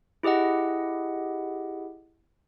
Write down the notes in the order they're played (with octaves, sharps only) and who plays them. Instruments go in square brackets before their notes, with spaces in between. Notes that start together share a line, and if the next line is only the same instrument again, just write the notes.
[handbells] E4 G4 G#4 D#5 F#5